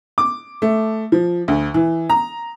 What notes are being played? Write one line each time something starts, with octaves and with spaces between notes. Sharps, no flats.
D6
A3
F3
D2
E3
A#5